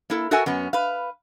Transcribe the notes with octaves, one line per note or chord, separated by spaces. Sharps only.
A#3 E4 A4
F#4 A4 A#4 E5 F#5 G#5
F#2 B3 C#4
B4 F5